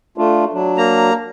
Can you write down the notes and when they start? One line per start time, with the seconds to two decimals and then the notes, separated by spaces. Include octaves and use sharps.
0.18 A3 D4 F4
0.53 F#3 D4
0.77 A#3 A#5